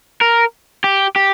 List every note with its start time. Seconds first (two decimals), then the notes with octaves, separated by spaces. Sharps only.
0.21 A#4
0.84 G4
1.16 G4